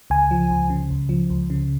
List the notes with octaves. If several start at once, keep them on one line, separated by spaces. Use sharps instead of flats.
C#2 G#5
F3
C#2
C#3
C#2
F3
C#2
C#3